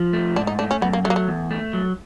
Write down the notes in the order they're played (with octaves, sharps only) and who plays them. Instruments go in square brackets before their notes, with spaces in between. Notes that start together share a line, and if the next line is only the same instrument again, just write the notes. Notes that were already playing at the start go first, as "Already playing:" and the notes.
Already playing: [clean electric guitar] F3
A3
[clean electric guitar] G#2 [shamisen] D4
[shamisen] D#4
[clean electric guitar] A3 [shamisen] D4
[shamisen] C#4
[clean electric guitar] F#2 [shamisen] B3
[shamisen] A#3
[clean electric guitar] F#3 [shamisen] A3
[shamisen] A#3
A3
[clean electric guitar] E2
A3
F#3